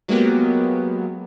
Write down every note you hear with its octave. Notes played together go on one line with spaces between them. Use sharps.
F#3 G#3 A#3 B3 G4